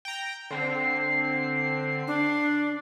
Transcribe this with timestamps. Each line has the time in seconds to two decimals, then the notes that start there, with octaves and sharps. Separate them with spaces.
0.05 G5 A#5
0.51 D3 C4 C7
2.07 D4